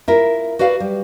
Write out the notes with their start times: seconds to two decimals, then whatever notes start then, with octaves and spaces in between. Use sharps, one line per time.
0.08 E4 F4 A#4
0.59 F#4 B4 D5 F5
0.80 G3